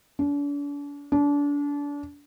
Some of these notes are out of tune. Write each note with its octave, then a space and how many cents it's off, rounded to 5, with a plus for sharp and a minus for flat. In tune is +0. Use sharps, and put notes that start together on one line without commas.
D4 -40
D4 -30